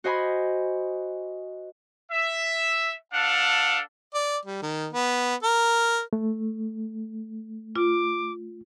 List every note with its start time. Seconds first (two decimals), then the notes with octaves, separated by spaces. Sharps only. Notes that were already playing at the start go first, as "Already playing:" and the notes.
0.04 F#4 C5 D#5 G#5 B5
2.12 E5
3.12 D4 A4 F5 F#5
4.14 D5
4.45 G3
4.62 D#3
4.92 B3
5.43 A#4
6.13 A3
7.76 F4 D6